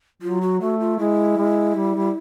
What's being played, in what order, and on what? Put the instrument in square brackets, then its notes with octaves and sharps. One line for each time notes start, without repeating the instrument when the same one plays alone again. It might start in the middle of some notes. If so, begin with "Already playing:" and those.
[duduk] F#3 [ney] F4
[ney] F#4
[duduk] A3 [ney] F#4
[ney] F4
[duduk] G#3 [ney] E4
[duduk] G#3
G3
G3